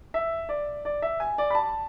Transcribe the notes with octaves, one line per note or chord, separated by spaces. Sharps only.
E5
D5
D5
E5
G#5
D5
B5
A5